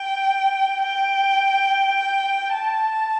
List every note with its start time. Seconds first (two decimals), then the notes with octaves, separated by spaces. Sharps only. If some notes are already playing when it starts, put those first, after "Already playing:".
Already playing: G5
0.82 G5
2.53 A5